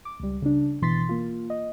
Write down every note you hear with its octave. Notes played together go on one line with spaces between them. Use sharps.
D6
C#2 G3
C#3 D4
G#1 B2 E3 C6 A6 B6
A#3 F4
D#5